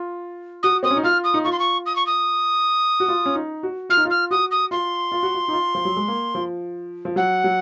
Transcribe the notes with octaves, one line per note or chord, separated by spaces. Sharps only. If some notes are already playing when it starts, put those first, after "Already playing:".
Already playing: F4
F#4 D#6
C4 D#6
C#4
D#4
F4 F6
D#6
D#4
F4 C#6
C6
C#6
D#6
C#6
D#6
F#4
F4
C#4
D#4
F#4
F4 F6
D#4
F4
F6
F#4 D#6
D#6
F4 C6
F4
F#4
F4
D#4
F4
F3
F#3
G#3
A#3
F3
F3
F#3 F#5
F#3